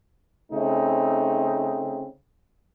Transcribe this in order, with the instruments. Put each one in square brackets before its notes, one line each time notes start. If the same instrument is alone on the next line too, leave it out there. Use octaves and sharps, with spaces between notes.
[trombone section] C#3 A3 C4 D#4